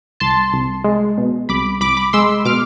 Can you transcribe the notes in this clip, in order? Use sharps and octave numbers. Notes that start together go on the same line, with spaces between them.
C2 A5 C6
C2
G#3
B2
C2 B5 D6
C2 B5 D6
B5 D6
G#3 C6 E6
B2 D6 F6